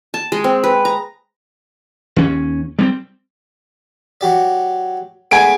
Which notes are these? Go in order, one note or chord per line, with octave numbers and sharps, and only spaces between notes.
A5
G#3
C4
B4
A#5
D#2 C#4
G3 A#3 C4
F#3 G4 D5
G#3 A3 B3 G#5 D7